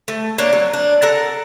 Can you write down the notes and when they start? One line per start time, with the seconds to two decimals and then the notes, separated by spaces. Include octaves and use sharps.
0.08 A3
0.38 A3 A#3 D4 C#5
0.53 F#3
0.73 D4
1.02 A4 A#4 F#5